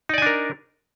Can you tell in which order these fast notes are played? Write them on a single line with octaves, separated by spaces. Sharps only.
D#4 D5 G#5 D4 A#4